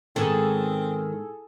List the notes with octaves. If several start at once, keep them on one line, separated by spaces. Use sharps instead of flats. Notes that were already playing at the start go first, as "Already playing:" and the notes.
G#2 D#3 B3 C4 G#4 A4